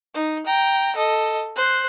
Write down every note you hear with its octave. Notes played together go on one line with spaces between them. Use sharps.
D#4
G5 A#5
A4 D#5
C5 F#6